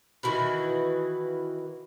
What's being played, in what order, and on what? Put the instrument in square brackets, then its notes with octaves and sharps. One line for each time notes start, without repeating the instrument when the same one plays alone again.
[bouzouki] D#3 E3 F#4 B4